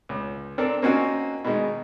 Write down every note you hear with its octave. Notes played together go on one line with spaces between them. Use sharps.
C#2
C4 D4 A4 A#4
A#3 C4 C#4 D#4 F#4
B2 D#3 G#3 D#4